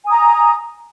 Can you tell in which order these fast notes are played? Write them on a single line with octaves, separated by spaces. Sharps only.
G#5 D#6 A#5